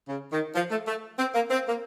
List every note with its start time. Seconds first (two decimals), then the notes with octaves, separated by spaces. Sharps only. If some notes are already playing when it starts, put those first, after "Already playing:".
0.09 C#3
0.33 D#3
0.55 F3
0.71 A3
0.88 A3
1.19 C4
1.35 A#3
1.50 C4
1.69 A#3